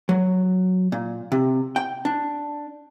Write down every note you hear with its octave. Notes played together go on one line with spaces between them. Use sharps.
F#3
A#2
C3
G5
D4